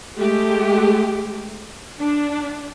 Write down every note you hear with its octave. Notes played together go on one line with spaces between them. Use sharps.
G#3 A3 G4
D4